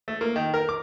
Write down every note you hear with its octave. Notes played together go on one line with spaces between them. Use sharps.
A3
A#3
D#3
A#4
D6